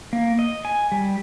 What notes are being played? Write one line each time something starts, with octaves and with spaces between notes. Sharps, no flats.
A#3
D#5
G#5
G3